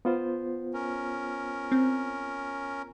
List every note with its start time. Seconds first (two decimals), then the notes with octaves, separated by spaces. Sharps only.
0.05 B3 F4 C5
0.74 C#4 A#4
1.72 C4